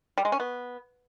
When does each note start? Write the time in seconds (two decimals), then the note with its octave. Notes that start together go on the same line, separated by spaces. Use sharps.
0.18 G3
0.25 G#3
0.32 C#4
0.40 B3